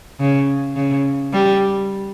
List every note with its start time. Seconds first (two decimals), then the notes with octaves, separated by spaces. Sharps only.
0.20 C#3
0.76 C#3
1.33 G3